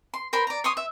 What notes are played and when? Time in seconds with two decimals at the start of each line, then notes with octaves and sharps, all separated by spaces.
0.14 C6
0.33 A#4 C5 B5 C6
0.47 D5 A#5
0.64 C#5 C6 D#6
0.77 E5